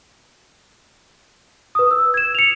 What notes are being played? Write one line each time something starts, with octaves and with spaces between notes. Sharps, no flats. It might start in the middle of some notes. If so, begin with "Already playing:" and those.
B4 D#6
E6
G#6 E7
C#7 F7